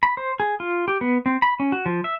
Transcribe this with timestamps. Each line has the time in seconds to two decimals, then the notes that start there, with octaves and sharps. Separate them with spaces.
0.03 B5
0.17 C5
0.40 G#4
0.60 F4
0.88 G4
1.01 B3
1.26 C4
1.42 B5
1.60 C#4
1.72 F#4
1.86 F3
2.04 E5